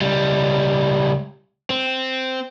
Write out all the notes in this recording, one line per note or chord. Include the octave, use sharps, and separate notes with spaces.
C#2 G3
C4